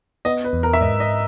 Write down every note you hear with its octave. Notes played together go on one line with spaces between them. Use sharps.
B3 D#5
B4
E2
A#4
E5
G#2 D#5
D#5